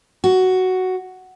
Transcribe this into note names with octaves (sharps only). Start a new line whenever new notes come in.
F#4